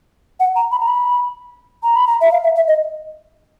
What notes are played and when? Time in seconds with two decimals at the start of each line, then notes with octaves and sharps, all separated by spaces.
0.40 F#5
0.56 A#5
0.72 B5
0.80 A#5
0.88 B5
1.83 A#5
1.96 B5
2.07 A#5
2.21 E5
2.32 F5
2.44 E5
2.56 E5
2.68 D#5